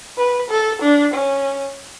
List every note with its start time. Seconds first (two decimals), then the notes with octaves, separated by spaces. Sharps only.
0.18 B4
0.50 A4
0.82 D4
1.14 C#4